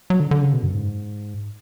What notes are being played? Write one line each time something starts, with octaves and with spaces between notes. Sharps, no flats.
F#3
D3
D3
C#3
B2
F#2
G#2